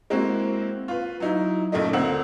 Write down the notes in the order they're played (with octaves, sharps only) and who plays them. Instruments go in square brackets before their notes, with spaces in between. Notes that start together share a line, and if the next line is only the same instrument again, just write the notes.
[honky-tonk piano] G#3 A#3 C4 E4 F#4
F4 B4
F#3 D#4 E4
B1 A#2 C#3 A3 D#5
D2 A#3 C4 F#5 E6 F#7